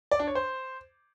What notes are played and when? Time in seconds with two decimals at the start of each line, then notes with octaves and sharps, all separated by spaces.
0.12 D5
0.19 D4
0.27 C#5
0.35 C5